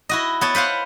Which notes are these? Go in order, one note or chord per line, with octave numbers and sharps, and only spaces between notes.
E4 F#4 D#5
B3 C#5 A5
B4 C5 F5 F#5